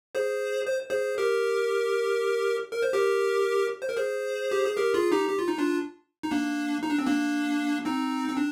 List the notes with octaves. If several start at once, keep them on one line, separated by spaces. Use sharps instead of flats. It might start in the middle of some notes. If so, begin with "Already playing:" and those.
G#4 C5
C5
G#4 C5
G4 A#4
A#4
C5
G4 A#4
C5
A#4
G#4 C5
G4
G#4
G4 A#4
F4 G#4
D#4 G4
G4
F4
D#4
D4 F4
D#4
A#3 D4
D#4
D4
C4
A#3 D4
C4 D#4
C4
D4